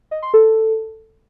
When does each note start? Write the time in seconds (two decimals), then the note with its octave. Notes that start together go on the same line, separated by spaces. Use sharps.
0.11 D#5
0.22 C6
0.34 A4